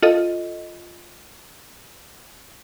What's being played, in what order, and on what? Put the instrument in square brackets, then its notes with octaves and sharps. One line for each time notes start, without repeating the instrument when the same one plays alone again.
[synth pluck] F4 A4 D#5